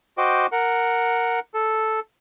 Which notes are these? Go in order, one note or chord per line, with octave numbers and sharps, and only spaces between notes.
F#4 C5 D#5 G5 D6
A#4 F#5
A4